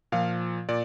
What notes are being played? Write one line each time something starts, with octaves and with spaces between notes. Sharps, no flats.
A#2 F3 F5
A#2 D5